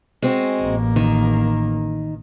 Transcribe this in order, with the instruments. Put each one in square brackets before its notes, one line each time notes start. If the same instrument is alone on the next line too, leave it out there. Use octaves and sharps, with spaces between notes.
[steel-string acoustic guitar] G#3 C4 F#4
[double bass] A1 A#3
[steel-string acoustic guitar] D#3